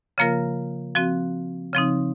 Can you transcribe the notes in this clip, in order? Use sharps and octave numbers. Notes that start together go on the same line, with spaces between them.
C#3 F3 A#3 F4 A#4
F3 C4 F#4
C#3 F3 C4 D#4